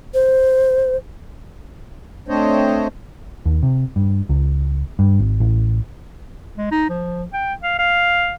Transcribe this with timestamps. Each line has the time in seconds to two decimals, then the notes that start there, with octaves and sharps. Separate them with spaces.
0.14 C5
2.28 A3 C4 D4 C5 C#5 D#5
3.45 D#2
3.63 C3
3.96 G2
4.29 C#2
4.99 G2
5.19 G#1
5.40 A1
6.58 G#3
6.71 D#4
6.89 F3
7.33 G5
7.63 F5
7.79 F5